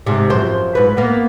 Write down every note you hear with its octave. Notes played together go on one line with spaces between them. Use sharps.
G#2 C3
F#2 F3 C5
G#2 B4
A#3 B3